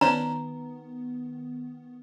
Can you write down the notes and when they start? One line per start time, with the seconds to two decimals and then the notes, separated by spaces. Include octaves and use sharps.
0.01 D#3 B3 C#4 D4 C5 A#5